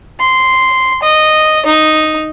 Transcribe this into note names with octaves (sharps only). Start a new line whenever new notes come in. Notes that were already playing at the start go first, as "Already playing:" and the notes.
C6
D#5
D#4